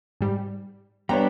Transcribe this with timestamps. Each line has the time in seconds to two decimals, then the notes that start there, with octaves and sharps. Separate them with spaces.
0.21 G#2 G3
1.09 G3 B3 D4 C#5 G5 A#5